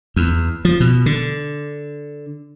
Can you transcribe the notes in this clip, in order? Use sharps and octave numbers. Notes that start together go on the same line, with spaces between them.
E2
F3
B2
D3